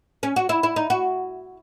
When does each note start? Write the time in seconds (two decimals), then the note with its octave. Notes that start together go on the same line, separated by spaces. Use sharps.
0.23 C#4
0.36 F#4
0.49 E4
0.63 E4
0.76 D#4
0.90 F#4